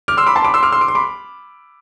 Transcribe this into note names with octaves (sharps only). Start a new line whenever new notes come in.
D6 F6
C6 E6
B5 D6
A5 C6
B5 D6
C6 E6
D6 F6
C6 E6
D6
C6
B5 D6